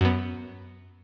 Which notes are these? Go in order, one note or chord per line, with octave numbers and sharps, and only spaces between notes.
F#2 B3